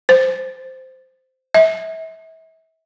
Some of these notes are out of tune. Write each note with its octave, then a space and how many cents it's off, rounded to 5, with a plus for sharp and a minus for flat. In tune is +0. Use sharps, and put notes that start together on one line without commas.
C5 -10
E5 -35